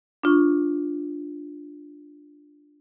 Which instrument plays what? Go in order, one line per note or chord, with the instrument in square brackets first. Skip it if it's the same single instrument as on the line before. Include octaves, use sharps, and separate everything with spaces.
[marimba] D4 F4 C#6